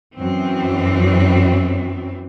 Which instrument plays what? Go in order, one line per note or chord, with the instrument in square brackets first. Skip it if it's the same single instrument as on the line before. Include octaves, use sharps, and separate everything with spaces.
[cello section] F#2 E3 C4